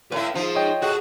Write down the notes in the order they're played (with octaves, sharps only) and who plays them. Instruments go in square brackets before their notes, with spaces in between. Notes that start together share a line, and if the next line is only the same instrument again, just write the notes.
[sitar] A2 E4 [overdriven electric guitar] B4 F5
[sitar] F3 [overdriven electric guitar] D#4 G#4
[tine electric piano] C#5 D#5 G5
[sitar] F#4 [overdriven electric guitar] G#4 A4